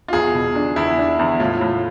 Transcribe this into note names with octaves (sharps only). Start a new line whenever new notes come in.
F4
E2 G#4
B2
D4
E2 E4
D4
E2
A2 F4
A2